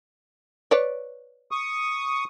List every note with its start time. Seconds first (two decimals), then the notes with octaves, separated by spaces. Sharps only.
0.71 B4 C#5 D5
1.51 C#6 D#6